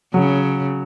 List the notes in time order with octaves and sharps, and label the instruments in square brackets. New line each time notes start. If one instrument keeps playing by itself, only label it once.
[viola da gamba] C#3 [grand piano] F#3